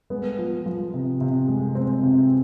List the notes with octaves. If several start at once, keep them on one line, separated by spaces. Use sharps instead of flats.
G#3 B3
F3
F3
C3
C3
G#3
G#3 C4
C3